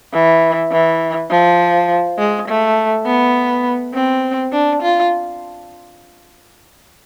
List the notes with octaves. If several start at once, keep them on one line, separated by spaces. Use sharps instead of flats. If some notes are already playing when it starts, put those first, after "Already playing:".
E3
E3
F3
G#3
A3
B3
C4
D4
F4